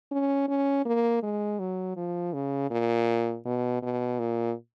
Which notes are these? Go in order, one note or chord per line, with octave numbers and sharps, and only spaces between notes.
C#4
C#4
A#3
G#3
F#3
F3
C#3
A#2
B2
B2
A#2